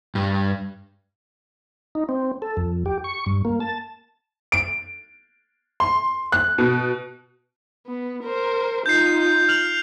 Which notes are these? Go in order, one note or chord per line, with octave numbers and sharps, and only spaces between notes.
G2
D#4
C4
A4
F2
G4
C#6
G2
A#3
A5
D7
C6
F#6
B2
B3
A#4 C5
D#4 F4 G6 C7
F6 F7 F#7